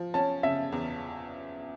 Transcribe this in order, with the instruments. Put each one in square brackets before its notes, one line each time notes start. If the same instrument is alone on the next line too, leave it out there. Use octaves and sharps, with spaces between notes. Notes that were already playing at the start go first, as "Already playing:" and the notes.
Already playing: [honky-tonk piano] F3
[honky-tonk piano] C#4 [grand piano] A5
[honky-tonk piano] C#3 [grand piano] E5
[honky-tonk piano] E2